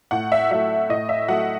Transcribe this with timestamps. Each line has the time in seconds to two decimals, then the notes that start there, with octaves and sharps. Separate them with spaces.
0.11 A2 F#5
0.32 E5
0.51 F#3 A3 E5
0.89 A2 D#5
1.09 E5
1.28 F#3 A3 F#5